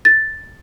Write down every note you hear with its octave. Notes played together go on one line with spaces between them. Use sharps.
A6